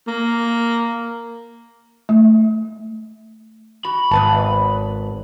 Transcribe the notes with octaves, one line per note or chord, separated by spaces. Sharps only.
A#3
A3
F#4 B5
G#1 B3 B4 A5